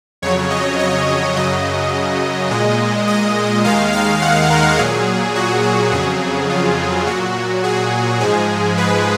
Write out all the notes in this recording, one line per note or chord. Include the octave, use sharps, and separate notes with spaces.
F2 C#3 F#3 C#5
D#5
D#5
F#2 C#3 F#3 D#5
A#2 G#3
D#5
D#2 D#3 G#3 F5
F5
F#5
A#4
A#2 F#3 G#4
F#4
F#4
F2 C#3 F#3 G#4
F4
A#2 F#3 F#4
G#4
G#2 F3 G#3 G#4
B4